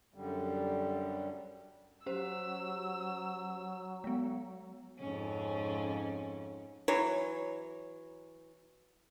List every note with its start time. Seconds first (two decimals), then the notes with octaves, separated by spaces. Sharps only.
0.14 F#2 D3 G3
2.06 F#3 C#4 G4 C5 E6
4.04 G#3 B3
4.99 F2 G#2 C#4
6.88 E3 F#3 C#5